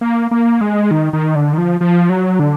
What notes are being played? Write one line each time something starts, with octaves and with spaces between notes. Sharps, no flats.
A#3
A#3
G#3
D#3
D#3
D3
D#3
F3
F3
F#3
D3